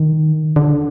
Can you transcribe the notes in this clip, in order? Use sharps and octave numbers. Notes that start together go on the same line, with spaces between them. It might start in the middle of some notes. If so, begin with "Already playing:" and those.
Already playing: D#3
D3